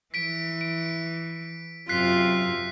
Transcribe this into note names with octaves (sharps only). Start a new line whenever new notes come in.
E3 B6 D7
D7
F#2 C3 F4 F#6 B6 C7